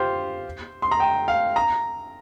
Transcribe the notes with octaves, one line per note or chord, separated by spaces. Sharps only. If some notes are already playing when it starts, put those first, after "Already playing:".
Already playing: F4 G4 C5
C6
A#5
G5
F5
A#5